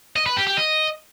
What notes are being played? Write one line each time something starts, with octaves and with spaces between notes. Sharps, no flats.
D#5
B4
G4
G4
D#5